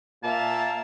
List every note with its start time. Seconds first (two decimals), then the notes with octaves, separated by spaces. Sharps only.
0.23 A#2 A#3 E5 F5 A5